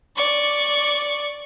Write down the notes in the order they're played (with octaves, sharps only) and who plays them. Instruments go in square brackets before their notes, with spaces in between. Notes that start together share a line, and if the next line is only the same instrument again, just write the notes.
[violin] D5 C#6